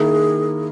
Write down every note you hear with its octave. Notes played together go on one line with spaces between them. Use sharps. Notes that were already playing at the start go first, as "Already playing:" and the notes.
Already playing: D#3 A#3 E4 G#4